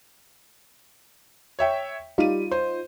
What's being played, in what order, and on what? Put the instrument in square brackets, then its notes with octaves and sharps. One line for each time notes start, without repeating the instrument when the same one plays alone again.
[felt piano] C#5 E5 G5
[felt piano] G3 D#7 [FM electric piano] D#4 F4
[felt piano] C5